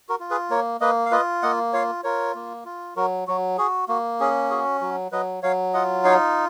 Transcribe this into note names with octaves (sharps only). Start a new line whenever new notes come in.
F#4 A#4
F4
G#4 B4
A#3 A#4 C#5
A#3 B4 D#5
F5
F4 B4 D#5
A#3 D#5 F#5
F4 C#5 F5
F4 A#4 C#5
A#3
F4
F#3 F#4 A#4
F#3 F#4
F#4 G#4
A#3 F#4
C#4 G#4
F#4 G#4
F#3 F#4
F#3 B4 D#5
F#3 C#5 F5
F4 D#5 F#5
D#4 C#5 F5